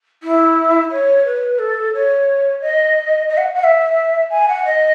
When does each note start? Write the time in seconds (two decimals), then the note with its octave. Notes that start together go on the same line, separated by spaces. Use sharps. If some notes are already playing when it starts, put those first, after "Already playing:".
0.23 E4
0.91 C#5
1.25 B4
1.58 A4
1.94 C#5
2.61 D#5
3.29 D#5
3.37 F#5
3.54 F#5
3.63 E5
4.30 G#5
4.48 F#5
4.65 D#5